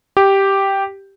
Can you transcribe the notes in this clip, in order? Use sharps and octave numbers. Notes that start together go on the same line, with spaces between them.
G4